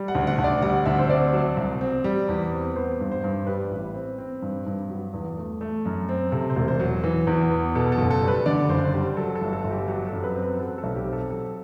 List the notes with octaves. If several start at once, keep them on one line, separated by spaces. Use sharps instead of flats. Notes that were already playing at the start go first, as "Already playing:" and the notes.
Already playing: G3
F#5
D2
F#5
D2
D5
G3 F#5
D2 E5
C5
C4 D5
F#3
C2
C4
G3
E2
C4
B3 C5
G2
C5
G2
G3 B4
A1
C4
C4
G2
G2
F#3
E2
A3
A3
F#2
C4
C3 A4
C5
E1
C5
F#3
E3
E2
B3
B2 A4
A4
F#1
A4
G3
B4
D3 D5
F#1 C5
G3
F#3 A4
A4
G1
A4
G1
G4
F#3 G4
A4
F#2
B4
C4
B4
F#3 A4
A4
B1
G4
C4
A4
F#3 A4